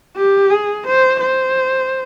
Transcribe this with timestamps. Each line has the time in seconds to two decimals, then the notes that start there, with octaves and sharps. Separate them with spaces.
0.17 G4
0.51 G#4
0.87 C5
1.21 C5